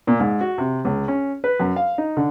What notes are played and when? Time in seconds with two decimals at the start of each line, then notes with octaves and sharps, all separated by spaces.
0.07 A#2
0.20 G#2
0.41 F#4
0.58 C3
0.85 C#2
1.08 C#4
1.44 B4
1.60 F#2
1.76 F5
1.98 D#4
2.17 D3